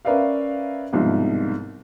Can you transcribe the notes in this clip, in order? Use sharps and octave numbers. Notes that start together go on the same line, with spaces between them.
C#4 A#4 B4 D5 E5 F5
C2 G#2 B2 F3